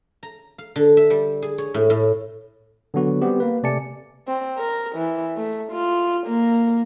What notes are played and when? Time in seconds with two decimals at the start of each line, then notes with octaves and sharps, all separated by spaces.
0.23 A#5
0.58 F5
0.76 D3
0.97 E5
1.10 G3
1.42 G#4
1.58 C#5
1.74 A2
1.90 A2
2.94 D3 F#3 B3 F#4
3.22 G3 B3 C4 G4
3.40 A#3 B4
3.63 C3 A3 D5 G#5 A5 C#7
4.27 C4
4.58 A#4
4.95 E3
5.37 A3
5.71 F4
6.26 A#3